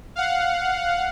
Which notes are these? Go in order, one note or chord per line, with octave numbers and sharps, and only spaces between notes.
F5 F#5